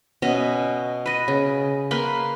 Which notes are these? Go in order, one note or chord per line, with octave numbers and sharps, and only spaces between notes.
B2 C#4 D#5 E5
B4 D#5
C#3
A#3 B4 B5 C6